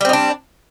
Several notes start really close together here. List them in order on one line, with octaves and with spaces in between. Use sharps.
G3 C4 D#4 D4